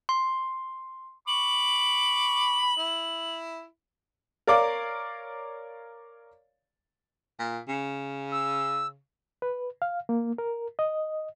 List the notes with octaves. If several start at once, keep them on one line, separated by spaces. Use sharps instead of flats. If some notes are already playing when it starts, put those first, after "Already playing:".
C6
B5 C#6 D6 F#7
E4
A#4 C#5 D5 F5 D6
A#2
C#3
E6
B4
F5
A#3
A#4
D#5